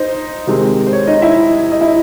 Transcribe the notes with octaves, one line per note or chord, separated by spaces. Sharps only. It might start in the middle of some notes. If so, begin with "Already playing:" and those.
Already playing: D#4 C5
C3 D#3 G#3 C4
C5
C#5
D#4 D#5
E4 E5
D#5
E4 E5